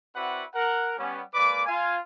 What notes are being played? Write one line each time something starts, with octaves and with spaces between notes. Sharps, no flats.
C4 E4 F#4 B4 D5 F#5
A#4 F#5
G3 B3 C#4
G#3 A#3 B4 D5 D6
F4 F5 G#5